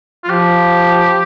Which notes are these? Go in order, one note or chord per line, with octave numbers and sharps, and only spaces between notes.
F4
F3 G4